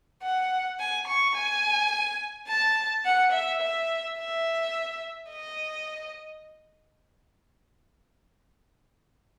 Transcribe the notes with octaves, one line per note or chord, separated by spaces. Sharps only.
F#5
G#5
C#6
G#5
A5
F#5
E5
E5
E5
D#5